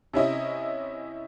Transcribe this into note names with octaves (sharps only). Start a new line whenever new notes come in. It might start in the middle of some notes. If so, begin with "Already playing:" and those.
C3 C#4 E4 D#5